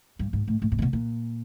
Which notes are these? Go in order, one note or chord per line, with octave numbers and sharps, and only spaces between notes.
G2
G#2
A2
A2
A#2
C3
B2
A#2